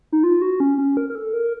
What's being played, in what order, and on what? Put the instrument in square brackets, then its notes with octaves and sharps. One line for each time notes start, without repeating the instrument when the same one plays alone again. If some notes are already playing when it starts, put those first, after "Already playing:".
[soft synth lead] D#4
F4
F#4
C#4
C#4
A#4
A#4
A4
A#4